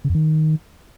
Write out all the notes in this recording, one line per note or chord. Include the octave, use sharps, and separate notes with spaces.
C#3
F2
D#3